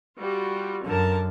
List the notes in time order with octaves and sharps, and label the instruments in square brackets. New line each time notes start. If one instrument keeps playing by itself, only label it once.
[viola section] G3 F4 F#4
[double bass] F#2 [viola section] D3 A#4 A5